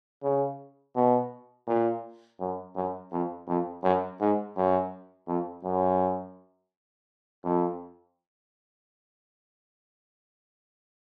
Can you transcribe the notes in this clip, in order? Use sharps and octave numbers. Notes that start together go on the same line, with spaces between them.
C#3
B2
A#2
F#2
F#2
F2
F2
F#2
G#2
F#2
F2
F#2
F2